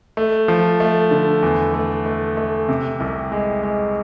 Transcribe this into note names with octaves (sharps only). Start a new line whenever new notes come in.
A3
F3
A3
D3
E2
A3
A3
A3
C3
C2
G#3
G#3